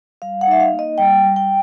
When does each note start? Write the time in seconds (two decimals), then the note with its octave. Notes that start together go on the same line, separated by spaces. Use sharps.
0.22 G3 F5
0.41 F#5
0.47 D#4 E5
0.60 F5
0.73 A#3
0.79 D#5
0.98 G3 G5
1.24 G3
1.36 G5